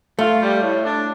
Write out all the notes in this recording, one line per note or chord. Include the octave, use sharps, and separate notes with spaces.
A3 F4
G3
A2
D4